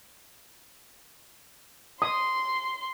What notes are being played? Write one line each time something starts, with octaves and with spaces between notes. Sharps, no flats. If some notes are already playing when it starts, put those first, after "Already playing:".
C6 D#6